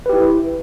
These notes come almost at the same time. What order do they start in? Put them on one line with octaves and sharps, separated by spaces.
B4 G4 E4